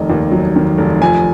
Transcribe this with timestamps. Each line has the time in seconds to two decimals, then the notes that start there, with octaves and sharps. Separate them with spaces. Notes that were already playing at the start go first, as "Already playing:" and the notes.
Already playing: F1 D#3 D#5
0.10 D#2
0.32 F#3
0.56 D#3
0.78 F1
1.01 F3 G#5